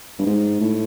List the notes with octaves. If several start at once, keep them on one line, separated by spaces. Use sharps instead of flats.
G2
G#2
A2